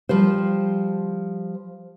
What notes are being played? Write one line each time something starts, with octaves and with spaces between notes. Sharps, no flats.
F3 G3 C5